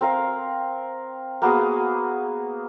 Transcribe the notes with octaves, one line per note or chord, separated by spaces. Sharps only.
C4 A#4 F5
A#3 B3 F#4 G#4